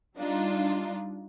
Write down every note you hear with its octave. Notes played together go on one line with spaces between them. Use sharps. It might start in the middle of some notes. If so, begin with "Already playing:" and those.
G3 D4 D#4 F4